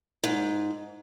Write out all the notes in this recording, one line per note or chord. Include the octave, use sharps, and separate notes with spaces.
G#2